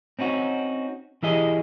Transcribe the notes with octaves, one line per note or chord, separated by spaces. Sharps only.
C4 C#4 D#4 F#4
E3 E4 G4 G#4 D#5